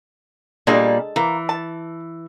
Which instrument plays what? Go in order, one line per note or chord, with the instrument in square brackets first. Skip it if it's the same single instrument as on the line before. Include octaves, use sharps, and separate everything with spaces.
[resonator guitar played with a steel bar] A#2 G3 A#3 [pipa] G#3 D4 A4
[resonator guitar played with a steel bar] E3 [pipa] A#3
[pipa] A5